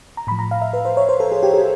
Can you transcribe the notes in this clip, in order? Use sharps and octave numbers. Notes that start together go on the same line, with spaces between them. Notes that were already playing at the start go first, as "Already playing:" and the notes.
A#5
A2 F3 B5
A#5
F5
E5
B4
C5
C#5
C5
A4
G#4
G4
G4